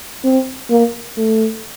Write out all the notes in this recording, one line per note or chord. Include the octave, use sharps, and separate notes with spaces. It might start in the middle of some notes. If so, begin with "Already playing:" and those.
C4
A#3
A3